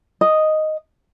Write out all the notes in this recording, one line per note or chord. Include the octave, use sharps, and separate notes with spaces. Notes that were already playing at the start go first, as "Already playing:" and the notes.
D#5